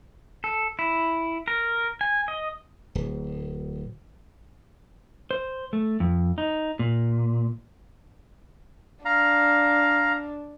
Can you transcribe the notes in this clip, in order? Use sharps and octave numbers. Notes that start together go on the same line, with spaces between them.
A4
E4
A#4
G#5
D#5
D1
C5
A3
F2
D#4
A#2
D4 F5 A#5